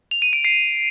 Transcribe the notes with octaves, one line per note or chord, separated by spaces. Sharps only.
F7
D#7
D7
C7